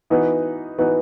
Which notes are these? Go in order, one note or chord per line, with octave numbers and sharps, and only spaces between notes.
E3 B3 D#4 F#4 B4
E3 B3 D#4 F#4 B4